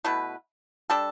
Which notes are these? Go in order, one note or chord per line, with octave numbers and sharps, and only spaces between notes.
B2 A3 E4 B4
G3 D4 A4